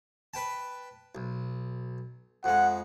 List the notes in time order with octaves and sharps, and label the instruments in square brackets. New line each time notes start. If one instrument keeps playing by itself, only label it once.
[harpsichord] B4 G5 A5
B1
[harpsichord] F2 G#3 [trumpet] F#5